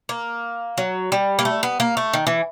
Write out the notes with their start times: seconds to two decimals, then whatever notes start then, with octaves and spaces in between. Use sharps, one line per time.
0.09 A#3
0.78 F#3
1.12 G3
1.39 A#3
1.45 A3
1.63 B3
1.80 A#3
1.97 A3
2.13 D#3
2.27 E3